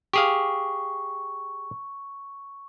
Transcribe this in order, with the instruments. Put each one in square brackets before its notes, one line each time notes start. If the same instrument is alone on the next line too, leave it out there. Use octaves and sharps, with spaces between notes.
[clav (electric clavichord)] G4 G#4 F5 [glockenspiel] C#6